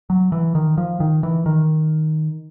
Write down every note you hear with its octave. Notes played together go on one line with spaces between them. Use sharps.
F#3
E3
D#3
F3
D#3
E3
D#3